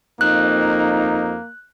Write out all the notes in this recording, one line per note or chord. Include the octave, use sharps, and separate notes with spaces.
F2 A#3 D#4 F#6